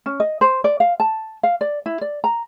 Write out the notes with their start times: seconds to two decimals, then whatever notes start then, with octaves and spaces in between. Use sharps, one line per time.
0.06 C#4
0.20 D#5
0.41 C5
0.64 D5
0.80 F5
1.00 A5
1.43 F5
1.61 D5
1.86 E4
2.01 D5
2.24 A#5